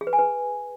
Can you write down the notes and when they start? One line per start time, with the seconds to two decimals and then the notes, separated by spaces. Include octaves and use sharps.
0.01 G#4
0.07 B4
0.13 G#5
0.19 B4